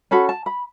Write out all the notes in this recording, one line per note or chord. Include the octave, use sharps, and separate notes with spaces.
C#4 F#4 A4 B5
A5
B5